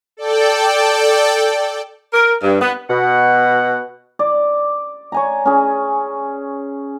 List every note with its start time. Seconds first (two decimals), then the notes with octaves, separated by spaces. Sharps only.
0.17 A4 D5 G5
2.14 A#4
2.42 G2
2.61 B3
2.90 B2 F#5
4.19 D5
5.12 C#5 G#5 A#5
5.46 C#4 G#4